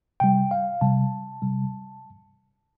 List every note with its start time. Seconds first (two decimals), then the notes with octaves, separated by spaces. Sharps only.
0.20 C3 G3 G5
0.51 F5
0.81 C3 G3 A5
1.42 C3 G3